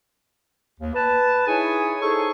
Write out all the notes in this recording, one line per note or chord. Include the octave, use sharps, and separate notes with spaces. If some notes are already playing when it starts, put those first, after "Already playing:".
D#2 A#3
B4 A5
D#4 E4 G#4 C#5 G#5
D#4 G#4 A4 C5 C#5 C#6